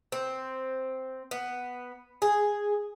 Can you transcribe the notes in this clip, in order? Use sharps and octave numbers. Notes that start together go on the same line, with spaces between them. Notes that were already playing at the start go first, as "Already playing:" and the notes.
C4
B3
G#4